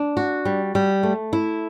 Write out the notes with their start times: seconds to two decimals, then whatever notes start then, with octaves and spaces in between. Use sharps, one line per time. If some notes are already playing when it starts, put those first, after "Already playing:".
Already playing: D4
0.17 F#4
0.45 G3
0.75 G3
1.03 A3
1.33 E4